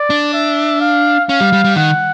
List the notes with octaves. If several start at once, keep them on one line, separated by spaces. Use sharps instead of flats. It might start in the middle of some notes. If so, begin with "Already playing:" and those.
Already playing: D5
D4
E5
F5
C#4 F5
G3
G3
G3
D#3 F#5